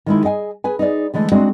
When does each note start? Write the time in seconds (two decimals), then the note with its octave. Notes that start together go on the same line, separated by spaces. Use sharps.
0.06 D#3 G#3 E4
0.24 G#4 D#5 G5 G#5
0.64 G#4 B4 G#5
0.79 D#4 G#4 D5
1.14 D3 E3 G#3 A3
1.32 G#3 C4 D4 F#4 G#4